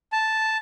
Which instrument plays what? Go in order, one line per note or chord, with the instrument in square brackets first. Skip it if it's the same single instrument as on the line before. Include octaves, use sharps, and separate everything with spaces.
[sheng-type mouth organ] A5